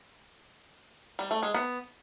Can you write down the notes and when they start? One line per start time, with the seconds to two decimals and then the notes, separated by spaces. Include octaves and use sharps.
1.19 G3
1.31 A3
1.43 G#3
1.54 B3